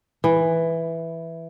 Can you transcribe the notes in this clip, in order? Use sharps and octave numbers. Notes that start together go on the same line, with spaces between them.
E3